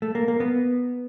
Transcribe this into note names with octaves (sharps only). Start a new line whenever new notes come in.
A3
A#3
A#3
B3